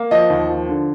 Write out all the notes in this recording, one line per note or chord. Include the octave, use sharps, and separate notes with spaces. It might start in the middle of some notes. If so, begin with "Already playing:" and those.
Already playing: A#3
F3 D#5
D#2
F3
D3